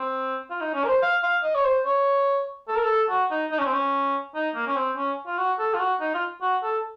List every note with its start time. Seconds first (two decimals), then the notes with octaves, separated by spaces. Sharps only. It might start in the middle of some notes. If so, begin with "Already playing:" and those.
Already playing: C4
0.50 F4
0.61 D#4
0.74 C#4
0.84 A#4
0.88 C5
1.03 F5
1.23 F5
1.44 D#5
1.55 C#5
1.65 C5
1.85 C#5
2.68 A4
2.76 A#4
2.84 A4
3.10 F#4
3.31 D#4
3.52 D#4
3.59 C#4
3.66 C4
3.73 C#4
4.35 D#4
4.55 A#3
4.67 C#4
4.76 C4
4.97 C#4
5.27 F4
5.38 F#4
5.59 A4
5.74 F4
5.80 F#4
6.01 D#4
6.14 F4
6.42 F#4
6.63 A4